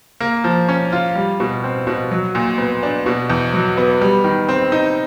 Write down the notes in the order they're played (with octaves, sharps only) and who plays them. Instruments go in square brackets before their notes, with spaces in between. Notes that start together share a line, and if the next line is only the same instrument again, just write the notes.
[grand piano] A#3
F3
C#4
F4
G3
B2
C4
B2
F#3
A#2
B3
D4
B2
E2
F#3
B3
G3
D#3
C4
D#4